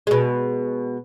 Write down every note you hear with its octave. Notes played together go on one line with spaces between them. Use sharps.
B2 G#3